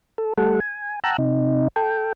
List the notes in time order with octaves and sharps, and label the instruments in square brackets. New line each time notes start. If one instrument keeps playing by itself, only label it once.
[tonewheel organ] A4
G3 A3 A4 F#5
G#5
F#5 G5 A5 A#5 E6 F#6
C3 D#4
A4 G5